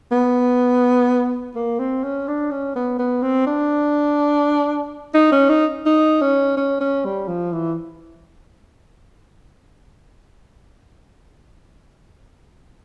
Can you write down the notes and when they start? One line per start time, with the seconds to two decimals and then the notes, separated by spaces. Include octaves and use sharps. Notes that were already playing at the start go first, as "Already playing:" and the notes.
0.12 B3
1.55 A#3
1.79 C4
2.03 C#4
2.28 D4
2.51 C#4
2.76 B3
2.99 B3
3.22 C4
3.46 D4
5.14 D#4
5.32 C#4
5.49 D#4
5.86 D#4
6.21 C#4
6.57 C#4
6.80 C#4
7.05 G3
7.28 F3
7.52 E3